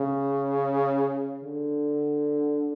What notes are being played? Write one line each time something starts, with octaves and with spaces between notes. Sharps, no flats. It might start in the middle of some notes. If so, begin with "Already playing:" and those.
Already playing: C#3
D3